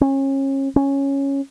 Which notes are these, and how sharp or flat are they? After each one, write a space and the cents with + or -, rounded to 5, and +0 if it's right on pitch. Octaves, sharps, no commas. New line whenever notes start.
C#4 -30
C#4 -5